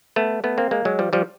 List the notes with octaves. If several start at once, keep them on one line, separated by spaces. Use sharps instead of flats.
A3 B3
A3 B3
A#3 C4
G#3 A#3
F#3 G#3
F3 G3
F3 G3